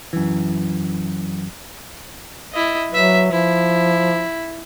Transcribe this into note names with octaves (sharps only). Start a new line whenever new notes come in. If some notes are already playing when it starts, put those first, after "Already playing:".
F#2 E3
E4 D#5
F#3 B4 E5
F3 E4